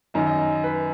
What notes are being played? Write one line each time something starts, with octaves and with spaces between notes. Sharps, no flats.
F#2 D#3 D#5
D#5
D#5
D#5
B4